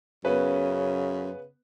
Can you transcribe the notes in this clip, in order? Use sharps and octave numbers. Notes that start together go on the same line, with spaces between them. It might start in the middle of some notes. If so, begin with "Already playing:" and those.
F#2 C#3 B3 B4